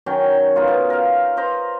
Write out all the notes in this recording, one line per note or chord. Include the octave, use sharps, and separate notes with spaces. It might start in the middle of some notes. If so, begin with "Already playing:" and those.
D#3 F#3 C#4 G5
B3 D#4 F4
B2
A#4 F5
B4 C5 D#5 A#5